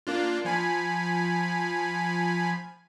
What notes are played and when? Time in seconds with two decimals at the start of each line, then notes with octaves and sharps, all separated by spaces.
0.07 A#3 D4 F4
0.45 F3 G#5 B5